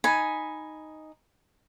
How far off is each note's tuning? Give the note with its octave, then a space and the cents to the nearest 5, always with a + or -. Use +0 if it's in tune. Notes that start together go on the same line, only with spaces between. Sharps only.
D#4 +0 G#5 +0 B5 +0